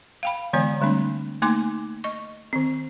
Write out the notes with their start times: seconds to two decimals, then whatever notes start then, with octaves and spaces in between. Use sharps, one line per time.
0.23 F5 G5 B5
0.53 D3 E3 G#3 B3 C#5 A#5
0.81 D3 G3 A3 C4 D4
1.42 A3 A#3 D#4 G#5 C6 D6
2.04 D#5 C#6
2.53 D#3 C4